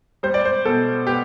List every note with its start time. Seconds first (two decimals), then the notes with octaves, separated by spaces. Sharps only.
0.23 G3 C5
0.34 D5
0.45 C5
0.65 B2 A4
1.07 B3 G4